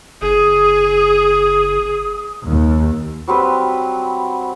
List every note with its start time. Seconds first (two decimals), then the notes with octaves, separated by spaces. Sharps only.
0.22 F#1 G#4 D#6
2.48 D#2
3.28 F#3 G3 C4 B4